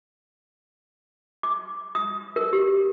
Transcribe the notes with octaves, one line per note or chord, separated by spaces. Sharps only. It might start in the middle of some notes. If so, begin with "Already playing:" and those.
D6
D#6
A#4
G4